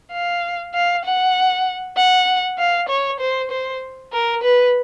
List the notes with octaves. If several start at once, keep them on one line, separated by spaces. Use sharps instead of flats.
F5
F5
F#5
F#5
F5
C#5
C5
C5
A#4
B4